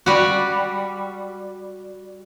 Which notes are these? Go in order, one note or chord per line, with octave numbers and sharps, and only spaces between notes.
G3 F#4